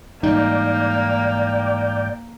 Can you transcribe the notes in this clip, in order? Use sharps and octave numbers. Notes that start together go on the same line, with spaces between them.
G#2 E3 G3 A#3 D#4 D5 G5